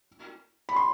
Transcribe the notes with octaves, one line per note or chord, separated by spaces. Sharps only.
B5
C6